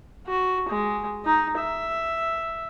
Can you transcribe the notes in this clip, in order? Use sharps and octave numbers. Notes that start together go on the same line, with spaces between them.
F#4
G#3
D#4
E5